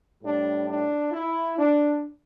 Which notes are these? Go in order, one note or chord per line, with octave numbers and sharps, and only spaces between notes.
A2 G3 D4
D4
E4
D4